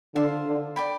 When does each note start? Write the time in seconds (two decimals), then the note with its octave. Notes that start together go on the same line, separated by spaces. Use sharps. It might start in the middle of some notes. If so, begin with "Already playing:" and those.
0.15 D3 F4 C5 E5
0.47 D3
0.76 D5 G5 B5